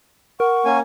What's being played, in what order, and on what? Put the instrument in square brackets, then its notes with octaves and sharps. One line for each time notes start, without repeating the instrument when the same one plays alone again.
[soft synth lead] A#4 [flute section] F#5 C#6
[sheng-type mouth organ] A#3 C#4 G#5